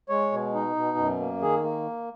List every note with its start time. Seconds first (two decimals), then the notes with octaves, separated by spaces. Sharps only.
0.09 G#3 C#5
0.32 B2
0.54 D#4
0.76 B2
0.98 F#2
1.20 A#3
1.41 D#3 G#4
1.64 A#3